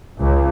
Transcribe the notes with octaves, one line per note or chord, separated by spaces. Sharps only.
C#2